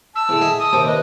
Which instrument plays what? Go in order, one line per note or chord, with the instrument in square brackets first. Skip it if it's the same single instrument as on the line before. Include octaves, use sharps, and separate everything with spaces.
[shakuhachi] A5 [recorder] E6
[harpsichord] E2 D3
G#4 D#5 E5
[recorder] D#6
[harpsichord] D#2 C3 G4
[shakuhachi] B4 [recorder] D#5